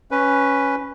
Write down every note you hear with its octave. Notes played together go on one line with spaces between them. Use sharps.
C#4 B4